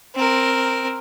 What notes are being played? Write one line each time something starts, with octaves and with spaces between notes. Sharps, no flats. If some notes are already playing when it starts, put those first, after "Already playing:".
C4 A#4